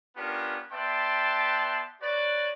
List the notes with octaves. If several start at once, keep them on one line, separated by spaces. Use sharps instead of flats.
B3 C#4 D4 F4 G4 A#4
B3 D5 E5 G5 A5 C6
F#4 B4 C#5 D5